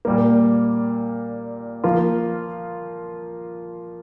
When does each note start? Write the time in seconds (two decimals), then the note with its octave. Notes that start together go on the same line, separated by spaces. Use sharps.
0.05 A#2 G3 A#3
1.84 F3 A#3 F4